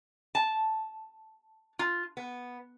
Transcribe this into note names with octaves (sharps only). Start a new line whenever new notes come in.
A5
F4
B3